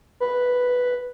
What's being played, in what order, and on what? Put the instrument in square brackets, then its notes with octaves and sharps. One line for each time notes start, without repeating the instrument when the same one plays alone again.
[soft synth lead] B4